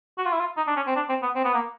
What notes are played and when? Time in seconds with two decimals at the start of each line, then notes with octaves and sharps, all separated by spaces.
0.18 F#4
0.26 F4
0.33 E4
0.40 F4
0.57 D#4
0.67 D4
0.77 C#4
0.87 C4
0.96 D4
1.09 C4
1.22 B3
1.35 C4
1.44 B3
1.54 A#3